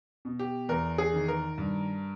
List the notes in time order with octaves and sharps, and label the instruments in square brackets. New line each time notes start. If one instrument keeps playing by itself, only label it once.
[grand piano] B2
G4
E2 A#4
G#4
D#3
A#4
G2